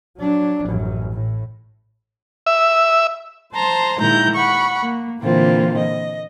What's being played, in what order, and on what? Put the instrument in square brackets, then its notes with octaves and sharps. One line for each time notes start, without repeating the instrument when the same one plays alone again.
[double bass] F#3 D4
A1 F#2
A2
[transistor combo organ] E5
[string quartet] C5 A5 A#5 C6
A#2 D#3 G#3 E4 A#5 G6
F#5 B5 C#6
A#3
A#2 D3 E3 A#3 C4 F4
D#5